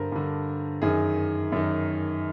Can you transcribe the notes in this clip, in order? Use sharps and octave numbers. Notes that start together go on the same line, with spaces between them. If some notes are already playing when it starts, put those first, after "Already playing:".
Already playing: G2 D3 A#4 C5
G2 D3
F#2 D#3 G#4
F#2 D#3